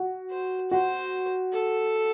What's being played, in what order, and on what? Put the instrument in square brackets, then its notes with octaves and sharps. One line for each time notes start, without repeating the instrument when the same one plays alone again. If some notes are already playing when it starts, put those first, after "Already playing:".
Already playing: [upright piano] F#4
[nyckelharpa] C5
[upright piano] F#4 [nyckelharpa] C5
[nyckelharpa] A4